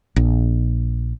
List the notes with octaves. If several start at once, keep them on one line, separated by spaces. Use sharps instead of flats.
A#1